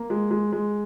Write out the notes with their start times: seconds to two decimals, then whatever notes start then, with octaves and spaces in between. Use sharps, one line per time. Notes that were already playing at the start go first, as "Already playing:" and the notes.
Already playing: A#3
0.10 G#3
0.31 G#3
0.52 G#3